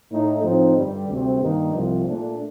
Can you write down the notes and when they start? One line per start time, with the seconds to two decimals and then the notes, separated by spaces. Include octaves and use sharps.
0.11 A2 A3 D#4
0.43 A2 F3 C4 D#4
0.76 G2 D3 G3
1.09 D2 C3 G3 C4
1.41 G2 D#3 A#3 D#4
1.74 C2 C3 F3
2.06 A#2 A3 D4